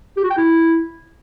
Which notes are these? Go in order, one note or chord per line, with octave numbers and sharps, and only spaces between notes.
G4
F#4
G5
E4